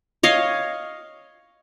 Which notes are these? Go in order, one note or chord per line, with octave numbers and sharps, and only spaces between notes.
C#5 D#5 F5